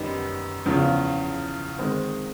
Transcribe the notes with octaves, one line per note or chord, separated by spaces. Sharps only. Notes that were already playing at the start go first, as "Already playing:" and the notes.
Already playing: F#2 D#3 G3 B3 D#4
E2 C#3 F3
D#3 G#3 C4